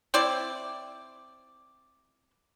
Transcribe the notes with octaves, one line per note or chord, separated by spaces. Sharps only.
C4 E4 D5